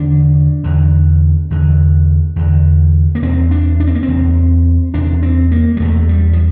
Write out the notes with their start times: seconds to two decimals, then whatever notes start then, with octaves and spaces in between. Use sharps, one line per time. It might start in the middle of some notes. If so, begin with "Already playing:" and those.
Already playing: E2 D3 D4
0.64 E2 D3
1.50 E2 D3
2.36 E2 D3
3.15 A#3
3.22 E2 C3 C4
3.51 D4
3.80 D4
3.87 C4
3.95 A#3
4.03 C4
4.08 E2 C3
4.94 E2 C3 D4
5.23 C4
5.52 A#3
5.77 G3
5.80 E2 C3 A3
6.09 G3
6.33 F3